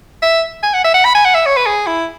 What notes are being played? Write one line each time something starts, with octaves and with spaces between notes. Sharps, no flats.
E5
G#5
F#5
E5
F#5
B5
G#5
F#5
E5
C#5
B4
G#4
E4